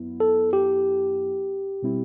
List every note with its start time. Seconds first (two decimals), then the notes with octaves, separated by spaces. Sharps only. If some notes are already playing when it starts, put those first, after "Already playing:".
Already playing: F#2 F#3 B3 E4
0.20 A4
0.53 G4
1.82 B2 G3 C4 E4